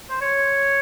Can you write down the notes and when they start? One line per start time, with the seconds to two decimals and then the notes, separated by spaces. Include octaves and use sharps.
0.10 C5
0.21 C#5